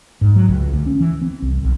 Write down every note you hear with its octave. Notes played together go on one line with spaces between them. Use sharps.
G#2
F#3
C#2
D2
C#4
E3
C4
C2
B1